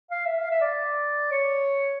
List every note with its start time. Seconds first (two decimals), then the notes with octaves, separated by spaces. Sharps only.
0.11 F5
0.26 E5
0.40 F5
0.51 E5
0.61 D5
1.31 C#5